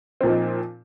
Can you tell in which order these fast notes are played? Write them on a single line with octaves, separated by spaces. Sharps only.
C4 A#2 F3 D#4